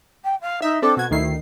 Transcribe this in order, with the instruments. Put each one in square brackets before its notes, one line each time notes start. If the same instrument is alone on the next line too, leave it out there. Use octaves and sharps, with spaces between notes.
[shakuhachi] G5
F5
[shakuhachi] D#4 [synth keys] E5
[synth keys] C4 A4 [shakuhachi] D4
[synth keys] B2 G#6 [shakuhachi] F#4
[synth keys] D2 D#3 C7 [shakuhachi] E4